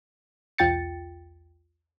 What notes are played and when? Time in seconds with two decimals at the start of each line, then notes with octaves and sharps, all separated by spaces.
0.58 B1 E2 F4 G5 A6 C#7